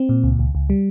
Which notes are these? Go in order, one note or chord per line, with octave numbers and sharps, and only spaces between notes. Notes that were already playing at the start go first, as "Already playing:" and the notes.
Already playing: C4
A#2
C#2
C#2
C#2
G3